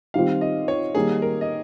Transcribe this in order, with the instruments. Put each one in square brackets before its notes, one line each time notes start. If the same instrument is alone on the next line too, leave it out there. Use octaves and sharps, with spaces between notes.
[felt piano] D#3 G3 C4 F4 [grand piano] F5
[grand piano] D#5
C#5
[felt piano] D#3 G3 A#3 D#4 [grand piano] G#4
[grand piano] A#4
D#5